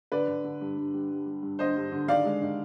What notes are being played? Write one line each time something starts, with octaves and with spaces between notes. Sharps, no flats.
D3 B4 D5
D3
D3
G2
G2
G3
G3
G3
G2
D3 C5 D#5
G2
D3
D#3 D5 F5
G#3
D#3